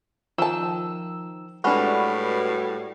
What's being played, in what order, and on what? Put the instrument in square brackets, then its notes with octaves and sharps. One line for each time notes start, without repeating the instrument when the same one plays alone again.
[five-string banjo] D#3 A5 [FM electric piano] F3 E6
[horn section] A2 G3 [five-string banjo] G#3 D4 [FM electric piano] F#4 B4 F6